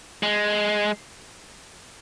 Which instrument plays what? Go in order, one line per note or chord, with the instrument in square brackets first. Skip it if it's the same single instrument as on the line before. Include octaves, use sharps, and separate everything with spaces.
[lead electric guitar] G#3